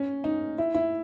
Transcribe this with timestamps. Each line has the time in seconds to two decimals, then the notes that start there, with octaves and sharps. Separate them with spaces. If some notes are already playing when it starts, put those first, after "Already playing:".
Already playing: C#4
0.24 D#4
0.58 E4
0.74 E4